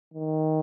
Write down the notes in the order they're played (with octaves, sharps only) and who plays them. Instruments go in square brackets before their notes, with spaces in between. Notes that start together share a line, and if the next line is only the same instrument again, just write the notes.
[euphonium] D#3